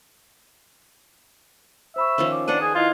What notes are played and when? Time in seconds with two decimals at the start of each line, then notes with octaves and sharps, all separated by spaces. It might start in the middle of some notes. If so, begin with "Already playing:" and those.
1.96 C5 E5 B5 C#6
2.18 D#3 F3 C#4
2.32 D6
2.48 D4 B4 C5 F#5 D#7
2.61 G#4
2.75 E4 F4 D#5 G#6